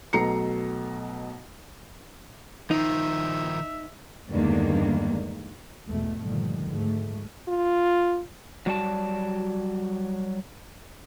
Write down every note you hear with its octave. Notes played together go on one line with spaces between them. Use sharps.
B1 B2 A3 A#5 C7 C#7
D#3 F3 D#4 E5
E2 G2 D3 D#3 G#3 A#3
G#1 E2 B2 A3
G2 A#2 D3 D#3 F3
D2 G#2 A3
F4
F#3 G3 F#4 D5 F5 A5